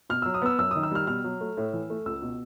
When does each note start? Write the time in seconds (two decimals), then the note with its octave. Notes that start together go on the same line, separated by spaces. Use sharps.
0.10 B2 F6
0.22 F#3 E6
0.34 D#6
0.42 B3 E6
0.59 F#2 E6
0.71 D#3 D#6
0.83 E6
0.91 G3 F6
1.07 B2 F6
1.24 F#3
1.41 A3
1.57 A2
1.73 E3
1.90 A3
2.06 C#2 E6
2.22 B2